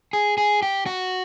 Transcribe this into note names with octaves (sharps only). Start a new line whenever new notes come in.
G#4
G#4
G4
F#4